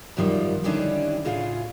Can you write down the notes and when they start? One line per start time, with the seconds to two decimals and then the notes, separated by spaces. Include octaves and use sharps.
0.17 F#2 D#3 F3 G3
0.64 D3 D#3 G3 C#4 D4 E4
1.25 A2 C#3 F4 G#4